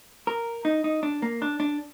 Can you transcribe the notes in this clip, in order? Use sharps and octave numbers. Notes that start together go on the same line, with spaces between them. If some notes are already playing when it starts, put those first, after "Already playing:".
A#4
D#4
D#4
D4
A#3
D4
D4